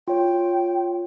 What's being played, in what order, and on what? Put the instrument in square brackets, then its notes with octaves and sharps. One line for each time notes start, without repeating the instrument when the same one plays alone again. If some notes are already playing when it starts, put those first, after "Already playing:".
[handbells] F4 C#5 [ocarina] G5